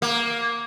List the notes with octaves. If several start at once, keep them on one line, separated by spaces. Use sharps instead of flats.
A#3